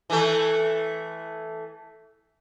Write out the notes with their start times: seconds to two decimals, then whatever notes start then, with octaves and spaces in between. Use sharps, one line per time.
0.10 E3 A3